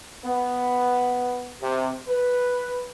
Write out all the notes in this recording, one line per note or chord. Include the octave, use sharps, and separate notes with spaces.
B3
C3
B4